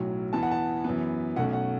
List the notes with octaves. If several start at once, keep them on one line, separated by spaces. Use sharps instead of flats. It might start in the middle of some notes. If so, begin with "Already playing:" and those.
Already playing: B1 A2 F#3
E2 E3 B3 A5
F#5
A5
F#2 E3 B3
B1 B2 A3 C#4 F#5
F#5